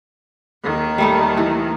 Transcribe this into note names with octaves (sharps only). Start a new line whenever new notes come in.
D#2 D#3
G3 A3 D#4
E3